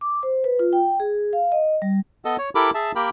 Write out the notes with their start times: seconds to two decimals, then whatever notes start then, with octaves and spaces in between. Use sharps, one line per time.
0.01 D6
0.23 C5
0.44 B4
0.59 F4
0.73 G5
1.00 G#4
1.33 F5
1.52 D#5
1.82 G3
2.25 B3 A4 D#5
2.38 C#5
2.55 E4 G4 A4 A#4 B5 D6
2.74 G#4 E5 A5
2.95 A#3 G4 A#4 G5 B5